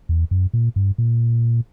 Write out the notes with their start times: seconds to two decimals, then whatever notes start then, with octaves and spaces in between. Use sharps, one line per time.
0.09 E2
0.31 F#2
0.54 A#2
0.76 G2
0.98 A#2